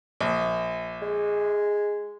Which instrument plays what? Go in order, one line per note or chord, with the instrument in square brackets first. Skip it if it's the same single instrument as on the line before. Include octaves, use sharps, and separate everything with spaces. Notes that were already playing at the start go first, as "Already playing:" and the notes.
[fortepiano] A#1
[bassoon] G#3